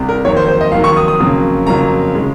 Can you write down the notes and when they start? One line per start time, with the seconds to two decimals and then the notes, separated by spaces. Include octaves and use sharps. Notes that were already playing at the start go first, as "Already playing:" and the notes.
Already playing: C2 C3
0.09 A#4
0.25 F2 D#3 F#3 A#3 C#5
0.37 C5
0.48 C5
0.61 D#5
0.72 F2 D#3 F#3 A#3 F5
0.84 C#6
0.96 D#6
1.08 D#6
1.20 F2 C#3 F#3 A#3
1.67 F2 C#3 F#3 A#3 A#5
2.15 C#3 G#3